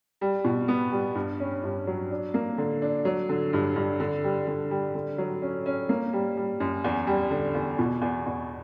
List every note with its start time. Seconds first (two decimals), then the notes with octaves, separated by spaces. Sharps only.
0.21 G3
0.45 B2
0.68 B3
0.92 G3
1.15 G2
1.40 C#4
1.63 G2
1.87 F#3
2.11 D4
2.34 A#3
2.58 D3
2.82 D4
3.05 F#3
3.29 D3
3.53 G2
3.76 G2
4.00 D3
4.24 G3
4.47 D3
4.71 G3
4.95 D3
5.18 F#3
5.42 C#4
5.66 C#4
5.89 A#3
6.13 G3
6.37 G3
6.60 F#2
6.84 E2
7.07 G3
7.31 D3
7.55 E2
7.79 B2
8.02 E2
8.26 E2